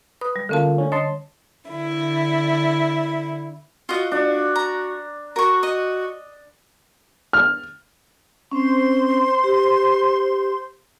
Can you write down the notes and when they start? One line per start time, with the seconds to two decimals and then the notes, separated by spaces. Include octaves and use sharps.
0.21 B4 D#6
0.36 G3
0.49 D3 A3 A#3 C#4 F4 A5
0.78 D3 C#4
0.92 C#5 D#5 A5 C6
1.69 D3 E4
3.89 F4 F#4 D#5
4.12 D4 F#4
4.56 A#5
5.36 F#4 A#4 C#6
5.63 D#5
7.33 F6
8.51 C4 C#4 C5 C6
9.44 G4